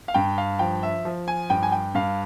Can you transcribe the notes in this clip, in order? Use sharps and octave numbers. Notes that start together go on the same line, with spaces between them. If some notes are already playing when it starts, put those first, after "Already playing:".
F5
G2 G5
F5
F3 G5
E5
F3
G#5
G2 G5
G#5
G5
G2 F5